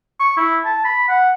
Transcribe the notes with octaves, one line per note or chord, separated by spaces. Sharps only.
C#6
E4
A5
B5
F#5